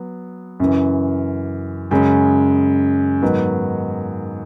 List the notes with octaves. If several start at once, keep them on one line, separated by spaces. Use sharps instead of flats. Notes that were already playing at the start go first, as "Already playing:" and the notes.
Already playing: F#3 B3
F#2 C#3 E3
F#2 C#3 G#3 C#4
G#2 D#3 F#3 B3